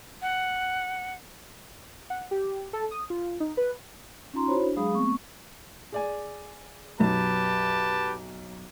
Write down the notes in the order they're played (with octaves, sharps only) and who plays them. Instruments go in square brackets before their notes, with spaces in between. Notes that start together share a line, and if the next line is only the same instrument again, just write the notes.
[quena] F#5
[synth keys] F#5
G4
A4
D#6
F4
D#4
B4
[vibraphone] C#4 D#4 F4 A#5 C6
E4 F#4 C5 C#5 B5
D4
F#3 G#3 G#4 F5 B5 D#6
A3 B3 C4 C#6
[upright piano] G#4 D5 G#5
[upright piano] B1 F#2 [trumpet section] G4 B4 A5